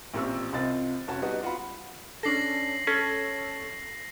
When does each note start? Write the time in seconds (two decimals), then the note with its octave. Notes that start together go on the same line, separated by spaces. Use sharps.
0.14 A1 A#2 C4 G4 C#6 E6
0.53 C2 C3 C4 F4 D#5 A6
1.08 F1 C#4 F#4 A5
1.22 G3 B3 D#4 F#4
1.43 F4 F#4 F#5 B5
2.23 C#4 D4 A4 A#6 C7 F#7
2.87 C#4 A4 C#5